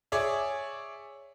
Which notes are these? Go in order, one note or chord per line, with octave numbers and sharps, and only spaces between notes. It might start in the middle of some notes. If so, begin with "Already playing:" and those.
G#4 C#5 D5 E5